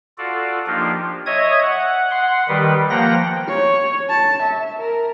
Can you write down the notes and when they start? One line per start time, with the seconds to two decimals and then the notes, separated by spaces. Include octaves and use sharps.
0.18 F4 F#4 A4 D5
0.67 F3 A#3 D4 D#4 F4 G4
1.26 C#5 D#5 E5 D#6 G#6
1.62 F#5
2.11 F#5 C6
2.48 D#3 G3 G4 B4
2.90 F3 A#3 F#5 G5 A#5 A#6
3.48 C#5
4.10 A5
4.42 E5
4.79 A#4